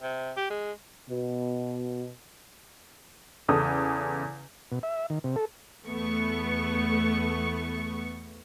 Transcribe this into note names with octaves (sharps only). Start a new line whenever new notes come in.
C3
G4
G#3
B2
E2 C#3 A4 D#6
B2
E5
D#3
C3
A4
E2 A3 B3 C#6